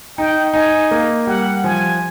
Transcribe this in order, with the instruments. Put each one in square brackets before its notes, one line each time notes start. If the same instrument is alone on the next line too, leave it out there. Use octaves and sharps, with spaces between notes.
[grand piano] D#4 [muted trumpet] G5
[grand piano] D#4 [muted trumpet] G#5
[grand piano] A#3
[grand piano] G3 [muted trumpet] F#5
[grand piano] F3 [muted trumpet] G#5